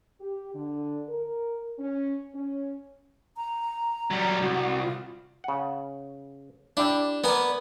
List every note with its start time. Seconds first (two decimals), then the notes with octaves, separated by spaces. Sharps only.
0.21 G4
0.54 D3
1.09 A#4
1.79 C#4
2.35 C#4
3.37 A#5
4.10 F#3 G3
4.41 C2 F#4
4.83 F4
5.44 C#3 F#5
6.77 D4 E4 G4
7.24 B3 A#4 B4 D5 G#5